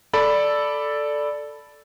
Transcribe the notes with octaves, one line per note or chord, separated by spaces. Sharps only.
A4 D5 B5